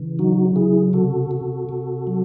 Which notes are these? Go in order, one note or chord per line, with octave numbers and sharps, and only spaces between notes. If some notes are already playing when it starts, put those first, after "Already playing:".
Already playing: C#3 E3
F#3 D#4 F#4
C#3 E4 G#4
C3 F#4 A4
C3
C3
F#3